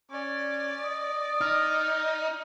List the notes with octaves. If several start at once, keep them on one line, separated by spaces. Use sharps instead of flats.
C#4 D5
D#5
D#4 F6